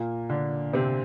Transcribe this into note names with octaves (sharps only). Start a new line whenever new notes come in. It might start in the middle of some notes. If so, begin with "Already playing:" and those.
Already playing: A#2 A#3
D3 D4
C3 C4